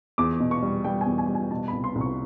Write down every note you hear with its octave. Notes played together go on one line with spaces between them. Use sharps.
E2 D6
B2
C#6
G3
G3 G5
G#5
E2
G#5
G3
G#5
B2 A5
C2 B5
C6
C2
C#6